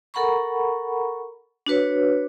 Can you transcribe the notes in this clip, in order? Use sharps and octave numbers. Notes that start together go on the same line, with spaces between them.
A4 A#4 F#5 A#5 B5 C#6
D4 F#4 B4 C#5